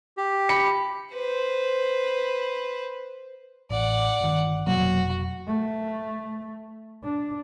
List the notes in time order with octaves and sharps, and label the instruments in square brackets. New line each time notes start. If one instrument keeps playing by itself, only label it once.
[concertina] G4
[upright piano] B5 C#7
[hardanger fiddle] B4 C5
[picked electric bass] A1 [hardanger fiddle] D5 F#5
[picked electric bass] G1 D#3
[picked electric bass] F1 B2 A#3 [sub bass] F#3 [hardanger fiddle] F#4
[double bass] A3
D4